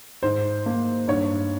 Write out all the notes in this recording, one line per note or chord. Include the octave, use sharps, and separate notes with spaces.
G#2 C5
A#3
G2 C#5